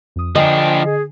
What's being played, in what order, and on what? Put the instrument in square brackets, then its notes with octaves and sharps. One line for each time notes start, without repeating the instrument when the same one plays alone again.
[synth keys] F2 D#6
[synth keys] D3 G#5 C7 [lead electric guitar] F3 D4 [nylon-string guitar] D#5 [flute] G5
[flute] G#4